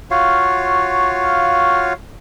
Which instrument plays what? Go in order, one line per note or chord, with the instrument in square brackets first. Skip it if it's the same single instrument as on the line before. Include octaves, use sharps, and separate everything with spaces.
[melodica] F4 F#4 C#5 F5